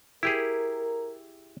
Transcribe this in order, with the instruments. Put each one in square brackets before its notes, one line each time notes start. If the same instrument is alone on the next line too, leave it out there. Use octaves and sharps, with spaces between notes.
[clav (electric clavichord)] E4 G4 G#4 [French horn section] A#4